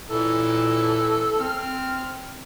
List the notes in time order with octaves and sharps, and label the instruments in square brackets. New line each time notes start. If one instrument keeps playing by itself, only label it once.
[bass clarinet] A#2 [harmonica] E3 A4
[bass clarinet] C4 [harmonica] F6